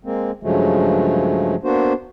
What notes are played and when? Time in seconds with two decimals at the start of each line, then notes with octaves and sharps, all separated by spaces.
0.05 G#3 A#3 C4
0.43 G2 C#3 F3 F#3 G#3 A3
1.64 A#3 B3 D4 F#4 C5